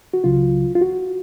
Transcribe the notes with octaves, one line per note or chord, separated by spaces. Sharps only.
F#4
C#2 C#3 F#3 F4
F4
F#4